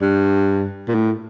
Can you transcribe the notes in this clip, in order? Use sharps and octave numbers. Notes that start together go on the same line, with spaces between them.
G2
A#2
A2